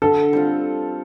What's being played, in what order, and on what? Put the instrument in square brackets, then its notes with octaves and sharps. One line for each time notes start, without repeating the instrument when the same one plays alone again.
[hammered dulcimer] D3 [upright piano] A4
[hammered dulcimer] G3 C4 F4